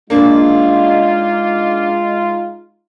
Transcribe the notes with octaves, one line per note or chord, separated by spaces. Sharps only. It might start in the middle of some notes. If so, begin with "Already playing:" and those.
G#3 A#3 D4 D#4 F4